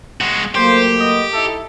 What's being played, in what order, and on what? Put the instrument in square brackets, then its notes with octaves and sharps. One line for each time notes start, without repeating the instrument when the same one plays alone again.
[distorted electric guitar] G#3 F#4
[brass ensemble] F#3 A3 A#3 [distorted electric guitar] G4 [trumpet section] C5
[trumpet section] B3 D#5
D#4 E4 A4